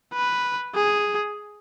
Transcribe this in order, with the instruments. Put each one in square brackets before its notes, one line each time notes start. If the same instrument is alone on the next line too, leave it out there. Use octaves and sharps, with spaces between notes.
[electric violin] B4
G#4